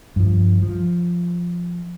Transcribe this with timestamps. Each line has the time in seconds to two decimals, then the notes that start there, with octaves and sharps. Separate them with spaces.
0.16 G2 F3
0.62 F3